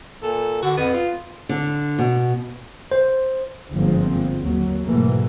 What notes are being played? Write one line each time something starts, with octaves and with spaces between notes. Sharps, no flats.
A#2 A4
D3 F#4
F2 B3
F4
D3
B2
C5
G1 G#2 F3 G#3 A#3 C4
D#2 F#3
G#2 B2 E3 F#3 A3 A#3